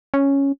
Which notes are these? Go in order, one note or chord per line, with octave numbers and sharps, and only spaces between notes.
C#4